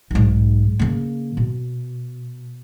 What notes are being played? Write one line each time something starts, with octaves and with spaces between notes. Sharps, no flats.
B1 G#2
C#3 A#3
B2